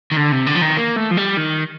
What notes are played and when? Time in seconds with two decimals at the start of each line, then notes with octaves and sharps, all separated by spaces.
0.12 D#3
0.17 D3
0.32 C3
0.47 D3
0.56 F3
0.62 D#3
0.77 A#3
0.97 A3
1.11 F3
1.17 G3
1.37 D#3